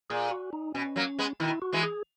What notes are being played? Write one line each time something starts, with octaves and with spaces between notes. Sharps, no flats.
A#2 G#4
F#4
D#4
B2 C#4
F#3 A#3
G#3 B3
B2 D#3 E4
F#4
E3 G#3
G#4